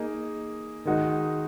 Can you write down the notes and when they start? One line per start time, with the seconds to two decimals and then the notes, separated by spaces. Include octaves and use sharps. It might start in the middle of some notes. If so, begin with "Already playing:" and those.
Already playing: A#3 D#4 G#4 D#5
0.85 D#3 G#3 D#4 F#4